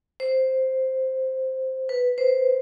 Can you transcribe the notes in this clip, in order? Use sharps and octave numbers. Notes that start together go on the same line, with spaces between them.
C5
B4
C5